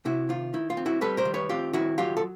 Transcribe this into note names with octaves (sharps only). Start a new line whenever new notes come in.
C3 E4 F#4
D#3 F4
D#3 E4
F4
C4
E4 F#4
G3 A4 B4
A#4 C5
D#3
B4 C#5
C4 F4 G4
D#3 E4 F#4
F#3 F4 G4
A4